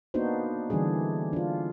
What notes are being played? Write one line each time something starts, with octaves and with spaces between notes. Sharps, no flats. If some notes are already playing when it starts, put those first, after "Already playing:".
A#3 B3 D4 D#4 F#4 C5
D3 E3 G3 D4 G#4
D4 F4